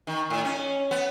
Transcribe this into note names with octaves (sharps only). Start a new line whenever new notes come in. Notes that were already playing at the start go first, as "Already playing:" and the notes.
D#3
A2
C#4
B3